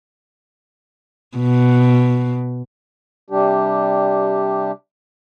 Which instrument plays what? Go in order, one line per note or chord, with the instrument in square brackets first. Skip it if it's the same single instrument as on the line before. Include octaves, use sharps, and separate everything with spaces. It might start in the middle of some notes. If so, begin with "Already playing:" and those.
[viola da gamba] B2
[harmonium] C3 G3 D4 G4